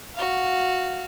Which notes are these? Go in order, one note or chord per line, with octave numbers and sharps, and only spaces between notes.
F#4 F5